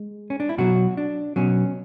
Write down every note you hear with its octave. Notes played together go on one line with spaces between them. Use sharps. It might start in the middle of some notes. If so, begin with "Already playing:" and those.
Already playing: G#3
C#4
D4
E4
B2 F#3 F#4
D4
B2 F#3 C#4